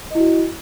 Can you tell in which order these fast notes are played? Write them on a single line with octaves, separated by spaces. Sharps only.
D#5 E4 F#4